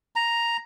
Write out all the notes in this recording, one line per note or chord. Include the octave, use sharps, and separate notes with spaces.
A#5